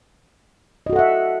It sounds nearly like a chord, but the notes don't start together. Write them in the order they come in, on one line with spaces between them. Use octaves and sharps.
D#5 F#4 A4 F#5 E5